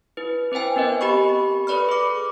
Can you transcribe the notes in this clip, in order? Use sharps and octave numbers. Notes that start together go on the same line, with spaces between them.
E4 B4
C4 B4 C5 G5 G#5
B3 C4 A#4 D#5
G4 B5 C#6
A4 B4 D5 B5 F6
G#4 D6